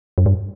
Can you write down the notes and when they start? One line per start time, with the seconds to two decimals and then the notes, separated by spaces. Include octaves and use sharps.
0.18 F#2
0.26 G2